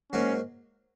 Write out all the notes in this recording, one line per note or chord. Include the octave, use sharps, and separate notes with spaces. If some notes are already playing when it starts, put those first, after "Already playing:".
G#2 F#3 A#3 C#4 F#4